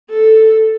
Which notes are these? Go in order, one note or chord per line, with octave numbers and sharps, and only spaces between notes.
A4